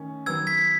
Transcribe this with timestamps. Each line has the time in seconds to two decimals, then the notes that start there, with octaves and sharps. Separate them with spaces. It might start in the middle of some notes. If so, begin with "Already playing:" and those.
Already playing: D#3 A3 C#4
0.26 D#3 F#3 B3 E6 G#6
0.47 G#6 B6